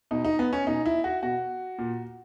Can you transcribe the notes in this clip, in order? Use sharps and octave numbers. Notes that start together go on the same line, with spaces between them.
B2 D#4
D#4
B3
C#4
B2 D#4
E4
F#4
B2 F#4
A#2